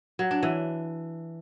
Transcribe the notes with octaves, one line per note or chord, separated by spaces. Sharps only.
F#3
D4
E3